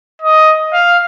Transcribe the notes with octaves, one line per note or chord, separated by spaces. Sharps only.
D#5
F5